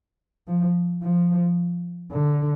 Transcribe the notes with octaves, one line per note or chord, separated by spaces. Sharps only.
F3
F3
D3